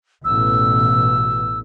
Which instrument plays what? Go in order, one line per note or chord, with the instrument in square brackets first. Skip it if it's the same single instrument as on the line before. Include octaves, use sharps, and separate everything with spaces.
[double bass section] A1 B2 [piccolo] E6